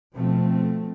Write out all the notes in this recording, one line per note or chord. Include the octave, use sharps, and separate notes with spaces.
B2 F3 A3 C4